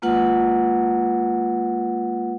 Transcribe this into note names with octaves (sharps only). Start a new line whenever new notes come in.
G#3 A#3 F4 B4 F#5